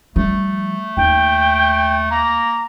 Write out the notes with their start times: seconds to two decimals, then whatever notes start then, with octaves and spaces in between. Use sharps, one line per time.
0.16 F3 G3 A3
0.97 D#2 G5
2.10 A#3 A#5